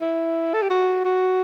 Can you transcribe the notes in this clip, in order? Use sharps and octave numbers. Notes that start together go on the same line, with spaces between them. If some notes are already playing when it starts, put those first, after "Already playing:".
E4
A4
G4
F#4
F#4